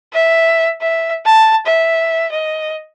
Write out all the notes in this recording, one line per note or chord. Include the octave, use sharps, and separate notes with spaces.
E5
E5
A5
E5
D#5